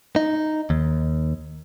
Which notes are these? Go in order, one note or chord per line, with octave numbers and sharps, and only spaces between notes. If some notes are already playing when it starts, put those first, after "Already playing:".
D#4
D#2